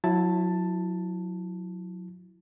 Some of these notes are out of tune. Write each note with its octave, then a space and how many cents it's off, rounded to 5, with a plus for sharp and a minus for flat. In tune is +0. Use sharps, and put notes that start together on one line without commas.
F#3 -30 E4 +0 A5 +5